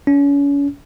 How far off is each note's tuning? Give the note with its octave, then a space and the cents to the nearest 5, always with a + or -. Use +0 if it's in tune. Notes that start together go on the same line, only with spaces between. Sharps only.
C#4 +35